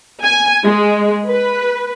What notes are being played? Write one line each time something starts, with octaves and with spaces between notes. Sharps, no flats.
G#5
G#3
B4